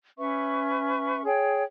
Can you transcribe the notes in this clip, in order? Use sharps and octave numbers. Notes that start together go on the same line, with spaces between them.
C#4 B4 E5 C#6
G#4 C#5 G5